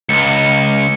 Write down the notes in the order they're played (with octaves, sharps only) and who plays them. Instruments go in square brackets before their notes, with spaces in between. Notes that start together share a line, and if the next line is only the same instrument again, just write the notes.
[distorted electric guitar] C#2 [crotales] C#7